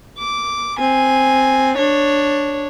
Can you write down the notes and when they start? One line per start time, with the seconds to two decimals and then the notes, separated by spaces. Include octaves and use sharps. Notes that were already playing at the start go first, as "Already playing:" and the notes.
0.18 D6
0.79 C4 G#5
1.78 D4 C#5